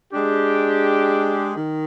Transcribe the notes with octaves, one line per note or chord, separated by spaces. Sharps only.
G#3 D4 G4
D#3